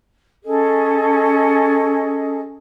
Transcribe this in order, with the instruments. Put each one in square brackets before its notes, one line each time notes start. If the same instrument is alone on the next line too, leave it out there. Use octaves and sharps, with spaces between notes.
[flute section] C#4 G#4 A4 D#5